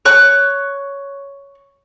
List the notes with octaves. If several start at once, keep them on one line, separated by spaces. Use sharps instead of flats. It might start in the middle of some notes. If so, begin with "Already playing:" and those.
C#5 C#6 F#6